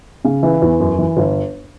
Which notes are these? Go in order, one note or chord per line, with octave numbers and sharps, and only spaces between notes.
C#3
E3
E2
F#2
E3
G1